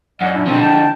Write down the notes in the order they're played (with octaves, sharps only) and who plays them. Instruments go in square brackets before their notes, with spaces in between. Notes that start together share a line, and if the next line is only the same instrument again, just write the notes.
[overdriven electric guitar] F#2 [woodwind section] D5 D#5 F#5
[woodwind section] A#2 D4 E4
[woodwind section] B2 F#3 C4 [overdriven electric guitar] D3 F3
[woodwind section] G5 A5